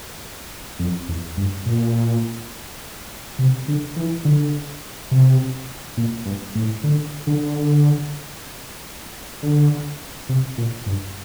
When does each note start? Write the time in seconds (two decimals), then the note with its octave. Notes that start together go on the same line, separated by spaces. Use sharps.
0.79 F2
1.09 E2
1.37 G2
1.66 A#2
3.39 C3
3.68 D3
3.96 E3
4.25 D3
5.11 C3
5.97 A#2
6.26 G2
6.55 A2
6.83 D3
7.27 D3
9.43 D3
10.29 C3
10.58 A#2
10.86 G2